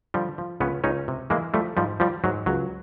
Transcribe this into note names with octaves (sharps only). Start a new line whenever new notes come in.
D3 F3 G3
F3
C#2 B3 C#4
C#2 C#4 D#4
C3
E3 G#3 A#3
F3 G3 A3
G#2 F3 G3
F3 G3
G#2 F#3
C#2 F#3